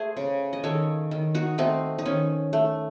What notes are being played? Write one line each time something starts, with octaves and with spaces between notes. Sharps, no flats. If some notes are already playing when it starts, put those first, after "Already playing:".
Already playing: A3 G#4 C5
C#3
D#5
D#3 A4 C#5
D#3
D#4 F#4
A3 C4 D#4
D#4
D#3 C#4
A3